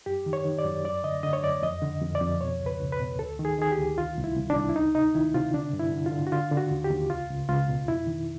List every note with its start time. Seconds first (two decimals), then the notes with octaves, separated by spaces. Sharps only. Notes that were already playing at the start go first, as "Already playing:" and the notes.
0.06 F#2 G4
0.26 D#3
0.33 C#5
0.45 D#3
0.59 D5
0.65 F#2
0.84 F#2 D5
1.03 D3 D#5
1.23 D3 D#5
1.33 C#5
1.43 F#2 D5
1.62 F2 D#5
1.82 D3
2.02 F2
2.15 D5
2.21 F2
2.41 B2 C#5
2.60 C#2
2.66 B4
2.81 C#2
2.92 B4
3.00 B2
3.19 D2 A4
3.39 D#3
3.45 G#4
3.59 D#3 G#4
3.72 G4
3.78 D2
3.98 C2 F4
4.17 C2
4.24 E4
4.36 C2
4.50 D4
4.55 C2
4.69 E4
4.75 D2 D#4
4.95 C3 D#4
5.15 D#3 E4
5.34 C3 F4
5.53 D3 D4
5.73 G2
5.79 E4
5.92 D3
6.06 F4
6.12 D3
6.27 F#4
6.32 D3 F4
6.51 D3
6.57 F#4
6.71 D#2
6.84 G4
6.90 D#2
7.10 C#2 F4
7.30 C#2
7.49 C#2 F4
7.68 B2
7.88 F2 E4
8.07 D#3